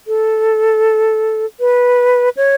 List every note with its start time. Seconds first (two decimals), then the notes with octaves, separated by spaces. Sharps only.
0.07 A4
1.60 B4
2.37 C#5